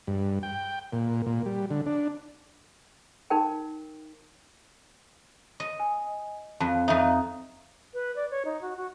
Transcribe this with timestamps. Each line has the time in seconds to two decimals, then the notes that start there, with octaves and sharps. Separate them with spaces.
0.07 G2
0.43 G5
0.93 A#2
1.26 A#2
1.46 G3
1.71 D3
1.86 D4
3.30 D#4 A#4 G5
5.60 D#5
5.80 G#5
6.60 F2 A5
6.88 F2 D#4 E5
7.94 B4
8.16 D5
8.31 C#5
8.45 D#4
8.62 F#4
8.77 F#4